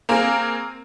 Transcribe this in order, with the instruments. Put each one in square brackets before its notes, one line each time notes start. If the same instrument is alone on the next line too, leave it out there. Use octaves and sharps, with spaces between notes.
[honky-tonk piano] A#3 C4 G#4 A#4